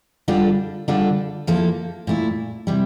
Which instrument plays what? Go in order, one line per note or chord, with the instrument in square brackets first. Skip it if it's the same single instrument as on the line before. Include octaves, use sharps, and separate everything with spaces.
[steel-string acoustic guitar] D3 G3 D4 F4 A4
D3 G3 D4 F4 A4
F3 A#3 E4 A4
A#2 A3 E4
C3 E3 G3